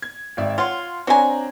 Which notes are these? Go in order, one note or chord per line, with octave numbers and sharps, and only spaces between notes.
G#6
G#1 D5 E5
F4 C#5 F#5 C6
F#3 C4 D4 G#5 A#5